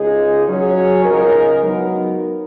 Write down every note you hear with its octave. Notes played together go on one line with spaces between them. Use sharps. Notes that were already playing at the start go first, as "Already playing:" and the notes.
Already playing: C#2 C#3 G#3 D#4 G#4
F#3 C#4 G#4 C#5
C#2 C#3 G#3 D#4 A#4
F#3 B3 D#4 A#4